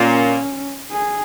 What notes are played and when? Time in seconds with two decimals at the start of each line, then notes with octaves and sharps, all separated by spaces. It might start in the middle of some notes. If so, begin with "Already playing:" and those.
Already playing: A#2 C#4
0.91 G#4